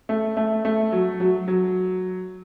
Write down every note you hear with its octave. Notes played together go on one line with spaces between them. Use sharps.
A3
A3
A3
F#3
F#3
F#3